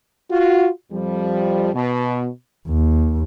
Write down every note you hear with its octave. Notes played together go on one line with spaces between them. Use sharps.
F4 F#4
F2 F3 G3
B2
D#2